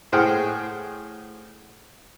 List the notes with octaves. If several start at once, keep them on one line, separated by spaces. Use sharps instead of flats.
A2 G#4 C5 F#5 G5 F6